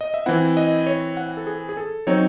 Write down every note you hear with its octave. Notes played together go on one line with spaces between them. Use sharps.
D#5
E5
E3 C4 E4 F#5
D#5
C#5
F#5
A4
G#4
G#4
A4
F#3 C4 D#4 C#5